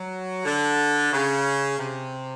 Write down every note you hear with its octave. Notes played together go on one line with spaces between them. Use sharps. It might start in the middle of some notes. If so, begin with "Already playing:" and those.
Already playing: F#3
D3
C#3
C3